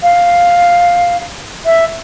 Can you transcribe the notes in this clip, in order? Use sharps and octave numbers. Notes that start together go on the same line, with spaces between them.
F5
E5